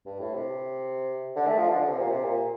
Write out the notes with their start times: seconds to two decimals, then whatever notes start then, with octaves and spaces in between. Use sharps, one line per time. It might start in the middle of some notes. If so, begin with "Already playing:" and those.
0.05 G2
0.20 A2
0.34 C3
1.36 D3
1.47 A3
1.58 F3
1.69 D3
1.80 D3
1.90 C3
1.99 A#2
2.10 C3
2.23 A#2